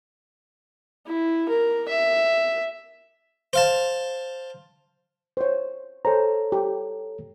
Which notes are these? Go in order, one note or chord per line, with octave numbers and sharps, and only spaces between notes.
E4
A#4
E5
C5 F5 A5
C5 C#5
A4 C5 C#5 G#5 A#5
G4